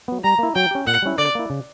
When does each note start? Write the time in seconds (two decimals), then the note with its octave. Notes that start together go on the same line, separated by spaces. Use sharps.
0.08 F#3 B3
0.24 G3 A#5
0.39 A#3 E4
0.55 F#3 G5
0.71 C#4 G4
0.87 A#2 F#5
1.02 G3 C#4 E4
1.18 D3 D5
1.35 A#3 E4
1.50 C#3